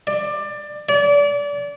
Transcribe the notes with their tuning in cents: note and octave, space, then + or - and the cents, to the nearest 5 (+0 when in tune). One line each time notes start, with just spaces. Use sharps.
D5 +20
D5 -30